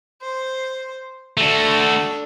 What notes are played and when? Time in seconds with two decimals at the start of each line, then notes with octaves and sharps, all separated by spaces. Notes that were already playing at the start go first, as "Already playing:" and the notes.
0.22 C5
1.37 A3 D4 F#4 A4